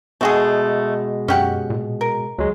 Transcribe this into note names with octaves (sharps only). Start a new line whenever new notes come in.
B2 G#3 A3 F#4 G#4
F#2 C#4 G4 F#5
A#2
A#4
D2 F#3 G#3